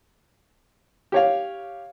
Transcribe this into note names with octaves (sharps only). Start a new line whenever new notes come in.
G4 C#5 F5